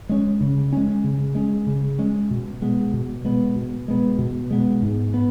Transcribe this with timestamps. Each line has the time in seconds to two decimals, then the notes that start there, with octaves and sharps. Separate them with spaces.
0.09 G#3 C#4
0.41 C#3
0.73 G#3 C#4
1.04 C#3
1.35 G#3 C#4
1.67 C#3
1.99 G#3 C#4
2.31 B2
2.62 G#3 B3
2.93 B2
3.25 G#3 B3
3.56 B2
3.88 G#3 B3
4.19 B2
4.51 G#3 B3
4.82 G#2
5.14 B3